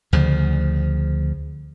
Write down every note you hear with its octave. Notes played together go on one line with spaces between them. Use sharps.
D2 C#3 F3